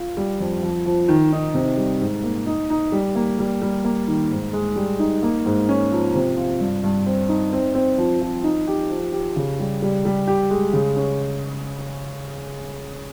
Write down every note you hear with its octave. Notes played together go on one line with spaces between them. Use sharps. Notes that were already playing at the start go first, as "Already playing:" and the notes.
Already playing: F4
G3
F2
F3
F3
D#3
D#4
C3
G3
G#2
A#3
D#4
D#4
G3
A#3
G3
G3
A#3
D#3
G#2
G#3
G3
D#4
A#3
G#2
C#4
F3
C3
F4
G2
G2
C4
D#4
C4
C4
F3
F3
D#4
G4
F3
G4
C#3
G3
G3
G3
G4
G#3
C#3
C#4